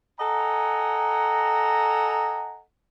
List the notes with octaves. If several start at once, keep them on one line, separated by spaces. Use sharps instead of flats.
A4 D#5 F#5 G#5 A#5